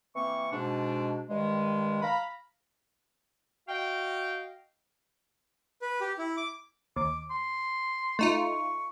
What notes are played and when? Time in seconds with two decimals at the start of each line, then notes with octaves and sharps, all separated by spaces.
0.15 E3 A#3 C4 C#6
0.52 G#2 B2 G#3 D4
1.29 G2 D#3 G#3
2.02 F5 A#5 B5
3.68 F#4 D#5 F5 G5
5.82 B4
6.01 G4
6.18 E4
6.37 D6
6.96 D#2 D6
7.31 C6
8.19 A3 D#4 F4 C#6